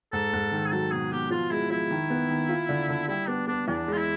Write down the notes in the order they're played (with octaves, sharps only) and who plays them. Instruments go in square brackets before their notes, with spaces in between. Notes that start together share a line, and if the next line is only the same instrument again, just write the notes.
[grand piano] G#2 [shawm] A4
[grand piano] G#2
D#3
[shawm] G#4
[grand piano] F#3 [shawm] A4
[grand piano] B2 [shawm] G#4
[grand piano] B2 [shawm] G4
[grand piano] F3 [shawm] F4
[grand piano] G#3 [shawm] E4
[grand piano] F3 [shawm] E4
[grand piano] D#3
B3
D#3
F4
D3
D3
[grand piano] G3 [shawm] E4
[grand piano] B3 [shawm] D4
[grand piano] B3 [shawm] D4
[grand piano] E2 [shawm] D4
[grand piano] G#3
[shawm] F4
E4